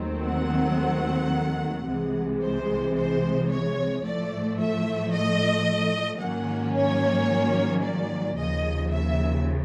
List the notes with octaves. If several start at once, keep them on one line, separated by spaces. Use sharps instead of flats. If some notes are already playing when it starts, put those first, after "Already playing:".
Already playing: D#2 D#3 F#3 A3 C4
F#5
C2 C3 E3 G#3
C5
C5
C#5
A2 F3 A3 D5
E5
D#5
G#2 D#3 F#3 A#3 C#4 F#5
C#5
D5
D#2 C#3 F3 D#5
E5